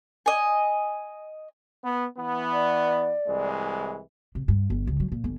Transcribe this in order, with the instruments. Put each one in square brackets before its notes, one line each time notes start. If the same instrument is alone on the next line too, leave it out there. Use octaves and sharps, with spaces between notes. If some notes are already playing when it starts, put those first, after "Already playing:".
[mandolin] D#5 G#5
[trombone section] B3
E3 B3
[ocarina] D5
[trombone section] C2 E3 G#3
[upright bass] C3
G2
G1
C#2
F#3
A#2
G1